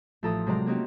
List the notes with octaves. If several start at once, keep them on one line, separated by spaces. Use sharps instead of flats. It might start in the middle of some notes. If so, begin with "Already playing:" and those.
A1 F3 A4 A#5 D#6
C3 F#3 G#3 C4 D5 A#5
A#3 C4 C#4 D#4 F#4 G4